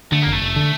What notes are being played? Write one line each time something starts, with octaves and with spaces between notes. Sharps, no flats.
D3 A3
F1 A#3
A3
F1
D3